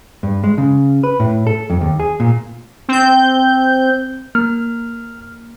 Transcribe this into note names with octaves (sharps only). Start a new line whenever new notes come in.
G2
G#3
C#3
B4
A2
A4
F2
D#2
G#4
A#2
C4 G6
A#3 F6